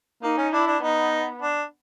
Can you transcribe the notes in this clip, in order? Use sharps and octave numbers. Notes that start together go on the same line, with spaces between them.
A#3 D#4
C#4
D4 E4
D4
B3 D#4
D4